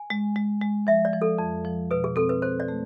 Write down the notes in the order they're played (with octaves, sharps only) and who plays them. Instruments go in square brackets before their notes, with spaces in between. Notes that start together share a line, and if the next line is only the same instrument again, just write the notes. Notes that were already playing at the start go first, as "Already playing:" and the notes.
Already playing: [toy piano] G#5
[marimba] G#3
G#3
G#3
[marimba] F3 [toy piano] E5
[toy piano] D5
[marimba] F3
[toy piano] A4
[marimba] F2
F3
[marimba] B2 [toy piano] B4
[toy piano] G#4
[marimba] C4 [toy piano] A4
[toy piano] B4
[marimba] C4 [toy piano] C5
[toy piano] D5
[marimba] A3